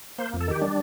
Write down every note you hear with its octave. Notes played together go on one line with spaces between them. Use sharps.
A#3 C5
F2
A4
D#3 G4
G3 D4